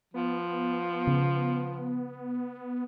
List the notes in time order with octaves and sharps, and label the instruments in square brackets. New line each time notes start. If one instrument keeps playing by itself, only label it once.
[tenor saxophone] F3 [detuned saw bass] B3
[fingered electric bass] C#3